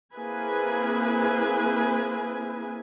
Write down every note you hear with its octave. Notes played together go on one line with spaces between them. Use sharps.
A#3 C4 E4 G#4 B4 G#5